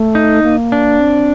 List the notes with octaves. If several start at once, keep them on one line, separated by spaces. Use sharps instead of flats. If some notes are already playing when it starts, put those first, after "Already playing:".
Already playing: A3
D#4
A#3
D4
C4